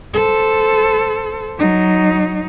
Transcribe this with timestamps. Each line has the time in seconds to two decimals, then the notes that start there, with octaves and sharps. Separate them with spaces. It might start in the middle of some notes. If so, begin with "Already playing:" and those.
0.14 A4 C5
1.58 F#3 D#4